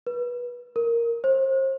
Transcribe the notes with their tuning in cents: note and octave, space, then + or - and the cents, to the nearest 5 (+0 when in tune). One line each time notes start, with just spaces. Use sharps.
B4 -25
A#4 +0
C5 +35